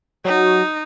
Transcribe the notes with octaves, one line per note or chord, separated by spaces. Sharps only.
F#3 D#4